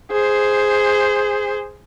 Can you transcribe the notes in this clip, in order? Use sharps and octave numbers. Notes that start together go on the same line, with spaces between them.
G#4 C5